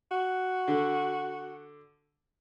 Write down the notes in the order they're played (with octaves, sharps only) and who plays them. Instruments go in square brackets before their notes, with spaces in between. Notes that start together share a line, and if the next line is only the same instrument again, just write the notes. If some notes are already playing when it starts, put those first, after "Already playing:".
[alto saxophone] F#4
[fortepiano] D3